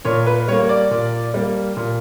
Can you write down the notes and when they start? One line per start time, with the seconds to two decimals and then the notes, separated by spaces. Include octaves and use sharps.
0.05 A#2 C#5
0.26 B4
0.48 G3 C#5
0.52 A#3
0.69 D5
0.91 A#2
1.34 G3 A#3
1.77 A#2